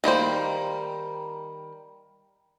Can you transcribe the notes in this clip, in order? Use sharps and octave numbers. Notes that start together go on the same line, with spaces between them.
D#3 G3 A#3 C5